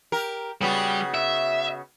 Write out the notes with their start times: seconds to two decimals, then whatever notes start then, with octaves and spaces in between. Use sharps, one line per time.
0.12 G4 A#4
0.61 C#3 G3 B3 F#4
1.14 E5